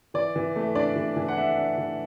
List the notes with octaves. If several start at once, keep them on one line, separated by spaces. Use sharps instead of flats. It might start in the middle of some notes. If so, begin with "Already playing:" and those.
E3 D5
E3
A3
D4 D5
E3
E3
F#5
A3 E5
D4
E3